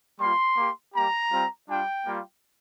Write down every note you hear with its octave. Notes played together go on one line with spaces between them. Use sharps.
G3 A#3 F4 C6
A#3 G4
G3 A#3 G4 A#5
G3 C4 F4
G3 D4 F4 G5
G3 A#3 F4